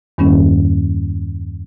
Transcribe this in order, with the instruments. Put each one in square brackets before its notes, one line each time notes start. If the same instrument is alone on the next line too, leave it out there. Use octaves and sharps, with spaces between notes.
[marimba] E2 G2 D#3 G3 A#3 C#4